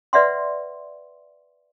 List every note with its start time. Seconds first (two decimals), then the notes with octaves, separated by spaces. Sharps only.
0.13 B4 D5 E5 F#5 C6